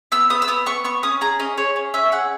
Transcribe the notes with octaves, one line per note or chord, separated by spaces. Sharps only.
B3 E6
B3 D#6
E6
B3 D#6
B3 C#6
B3 C#6
C#4 D#6
G#4 A#5
C#4 D#5
G#4 C#5
C#4
C#4 E5
G#4 F#5